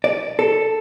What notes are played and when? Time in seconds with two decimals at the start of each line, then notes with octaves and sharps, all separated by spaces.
0.04 D5
0.39 A4